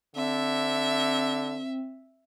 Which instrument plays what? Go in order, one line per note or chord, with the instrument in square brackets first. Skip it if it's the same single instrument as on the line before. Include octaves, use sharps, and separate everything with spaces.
[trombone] D3 [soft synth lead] C4 [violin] E5